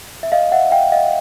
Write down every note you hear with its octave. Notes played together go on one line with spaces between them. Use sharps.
E5
D#5 F5
E5 F#5
F5 G5
D#5 F5